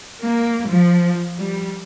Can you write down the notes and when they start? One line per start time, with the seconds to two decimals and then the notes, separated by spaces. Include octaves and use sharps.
0.21 A#3
0.70 F3
1.38 G3